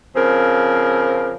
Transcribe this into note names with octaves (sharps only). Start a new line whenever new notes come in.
C#3 F3 C4 A#4